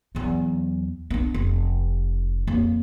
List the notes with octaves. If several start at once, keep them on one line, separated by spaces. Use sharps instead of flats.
E2 F#3
B3 D4
F1
F2 A#3